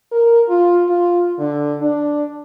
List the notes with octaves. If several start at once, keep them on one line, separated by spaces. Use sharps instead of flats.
A#4
F4
F4
D3
D4